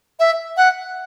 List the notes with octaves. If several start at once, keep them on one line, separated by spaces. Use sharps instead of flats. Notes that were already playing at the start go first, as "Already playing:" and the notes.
E5
F#5